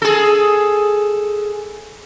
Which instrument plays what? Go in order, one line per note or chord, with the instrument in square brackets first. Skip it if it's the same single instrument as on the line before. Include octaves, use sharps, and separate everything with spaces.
[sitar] G#4 A4